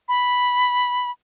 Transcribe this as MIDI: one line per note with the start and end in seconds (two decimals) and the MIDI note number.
0.09 1.11 83